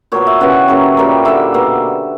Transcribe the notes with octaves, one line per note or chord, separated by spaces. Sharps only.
A#2 F#3 B3 C#5
E5
C#3 E3 G3 B3 F#5
C#3 F#3 A#3
A#2 G3 A#3
D3 A#3 E5
B2 A#3